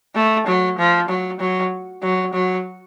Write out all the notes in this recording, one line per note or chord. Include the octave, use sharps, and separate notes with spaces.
A3
F#3
F3
F#3
F#3
F#3
F#3